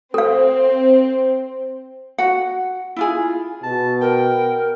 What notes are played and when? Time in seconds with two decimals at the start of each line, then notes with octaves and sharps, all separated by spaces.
0.14 C4 A4 F5
2.18 F#4 F#5
2.96 E4 F4 G#4
3.63 B2 A5
4.01 A#4 G5